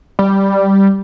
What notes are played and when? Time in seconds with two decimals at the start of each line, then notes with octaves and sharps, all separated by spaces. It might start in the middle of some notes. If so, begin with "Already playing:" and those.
0.19 G3